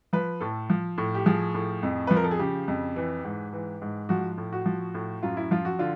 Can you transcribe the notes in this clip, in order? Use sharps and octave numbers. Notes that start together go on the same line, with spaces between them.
F3 B4
A2 A4
F3
A2
G4
F3 G#4
A2
F2
B4
F3
A#4
A4
G#4
C#3 G4
F2
E3
G#2
E3
G#2
F3 F#4
A2
F#4
F3
A2
F#2 F4
E4
F3 F4
F#4
D3 F4